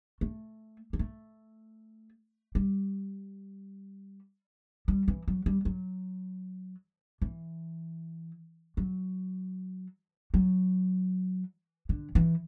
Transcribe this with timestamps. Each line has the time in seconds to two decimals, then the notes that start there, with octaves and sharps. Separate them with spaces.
0.21 A3
0.93 G3
0.99 A3
2.55 G3
4.88 G3
5.08 E3
5.28 F#3
5.46 G3
5.65 F#3
7.22 E3
8.77 F#3
10.34 F#3
11.89 D3
12.15 E3